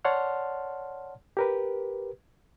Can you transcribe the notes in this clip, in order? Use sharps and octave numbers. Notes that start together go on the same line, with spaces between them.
C#5 D5 F#5 A5 C6 F6
G4 A#4 B4